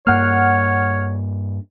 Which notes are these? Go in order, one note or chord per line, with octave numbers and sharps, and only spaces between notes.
G2 A#3 C#5 F#5 F6